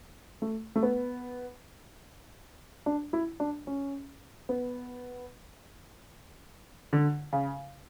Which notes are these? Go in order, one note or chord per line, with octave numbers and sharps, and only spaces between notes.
A3
A3
B3
D4
E4
D4
C#4
B3
D3
C#3